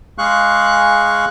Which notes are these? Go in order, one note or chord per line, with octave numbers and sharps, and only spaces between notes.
G#3 G#4 F5 C#6 F#6